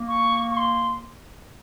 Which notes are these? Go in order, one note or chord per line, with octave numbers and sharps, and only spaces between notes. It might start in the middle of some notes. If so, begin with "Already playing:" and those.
Already playing: A#3
C#6
C#6
C6